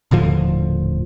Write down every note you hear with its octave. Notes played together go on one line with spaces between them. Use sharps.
D#1 A2 D3 F3